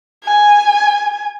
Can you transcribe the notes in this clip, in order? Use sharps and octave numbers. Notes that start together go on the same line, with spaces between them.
G#5